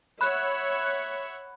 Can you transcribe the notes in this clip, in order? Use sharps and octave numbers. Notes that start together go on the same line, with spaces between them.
C#5 E5 F#5 B5 F#6